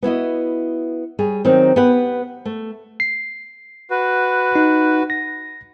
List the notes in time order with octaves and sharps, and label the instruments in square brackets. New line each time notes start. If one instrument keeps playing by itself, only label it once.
[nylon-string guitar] B3 E4 F#4 D#5
G3 G#4 C#5
D#3 F#3 C4 D#4
B3 G4 B4 F#5
A3
[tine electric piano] C7
[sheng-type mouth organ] F#4 B4
[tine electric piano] D#4
A#6